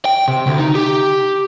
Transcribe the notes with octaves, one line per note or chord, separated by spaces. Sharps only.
G5
C3
D2
D#4
G4